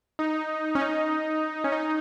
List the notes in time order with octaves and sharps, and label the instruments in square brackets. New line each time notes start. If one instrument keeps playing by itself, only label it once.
[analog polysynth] D#4
C#4
D#4
C#4
D#4